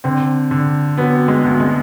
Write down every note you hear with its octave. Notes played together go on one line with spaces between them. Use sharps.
D3 C4
D3
F#3 B3
G#3
D2
G#3